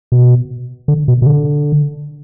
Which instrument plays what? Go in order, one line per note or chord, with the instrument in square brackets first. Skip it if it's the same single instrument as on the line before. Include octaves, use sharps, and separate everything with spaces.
[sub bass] B2
D3
B2
B2
D3